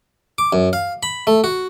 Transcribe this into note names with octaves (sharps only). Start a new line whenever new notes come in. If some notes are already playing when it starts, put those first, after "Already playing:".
D6
F#2
F5
B5
A3
F#4